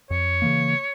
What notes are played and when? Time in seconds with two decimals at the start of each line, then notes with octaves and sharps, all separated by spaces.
0.10 F2 C#5
0.42 C#3 E3 A#3